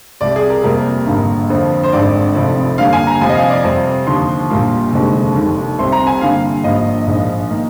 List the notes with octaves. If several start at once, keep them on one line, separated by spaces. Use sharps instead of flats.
C2 C3 G3 D5
G#4
A#4
F2 C3 G3 A#3 A#4
G#1 G2 D3 G3 A#3
F2 D3 F3 C4
C5
G#1 G2 D3 G#3 C4 D5
F1 F2 C3 F3 C4
G2 D3 G3 A#3 F5
G#5
A#5
F2 C3 F3 G#5
D#5
F5
D5
F2 C3 G3 C4
D#2 D3 F3 C6
A#1 A#2 G3 A#3
F1 D#2 D3 G#3 C4
F1 D#2 D#3
C2 C3 G3 C4 C6
A#5
G#5
G2 D3 G3 A#3 F5
G#1 G2 F3 A#3 D#5
A#1 G#2 F3
D#3 A#3